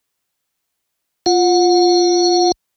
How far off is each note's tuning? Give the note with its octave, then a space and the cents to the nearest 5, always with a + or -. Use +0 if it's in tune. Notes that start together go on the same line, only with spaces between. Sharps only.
F4 +0 F#5 -25